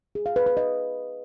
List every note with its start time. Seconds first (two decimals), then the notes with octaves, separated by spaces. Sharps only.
0.15 G#4
0.26 F5
0.36 B4
0.46 B4
0.57 D#5